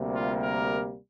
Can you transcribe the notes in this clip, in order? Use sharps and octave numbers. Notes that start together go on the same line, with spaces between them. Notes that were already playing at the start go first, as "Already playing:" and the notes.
Already playing: D2 C3 G3 A#3
F4
A#4